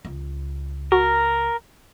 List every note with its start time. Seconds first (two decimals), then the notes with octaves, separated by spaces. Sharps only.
0.05 C#2
0.92 F#4 A#4